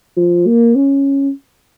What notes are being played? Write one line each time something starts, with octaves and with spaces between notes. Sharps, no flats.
F3
A#3
C#4